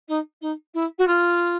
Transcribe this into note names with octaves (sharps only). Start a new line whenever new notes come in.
D#4
D#4
E4
F#4
F4